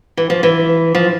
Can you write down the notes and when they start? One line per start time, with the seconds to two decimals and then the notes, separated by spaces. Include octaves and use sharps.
0.17 E3
0.30 F3
0.43 E3
0.95 F3